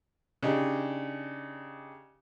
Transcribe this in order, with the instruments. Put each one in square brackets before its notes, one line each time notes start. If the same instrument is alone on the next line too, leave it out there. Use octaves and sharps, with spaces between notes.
[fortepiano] C#3 D4 D#4 G4